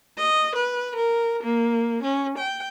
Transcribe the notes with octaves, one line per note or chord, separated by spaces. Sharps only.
D#5
B4
A#4
A#3
C#4
G5